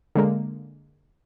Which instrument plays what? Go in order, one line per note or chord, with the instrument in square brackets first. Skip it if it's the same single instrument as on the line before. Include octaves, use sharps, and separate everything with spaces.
[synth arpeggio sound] D3 G#3 A#3